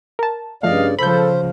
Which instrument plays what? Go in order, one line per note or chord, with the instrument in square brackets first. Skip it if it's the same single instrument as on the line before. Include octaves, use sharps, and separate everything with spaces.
[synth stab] A#4 A5
[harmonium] G2 C#3 D5 [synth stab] F3 A3 [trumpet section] D#5 F5
[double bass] C#3 F3 [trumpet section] A4 [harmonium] C5 [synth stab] B5 G6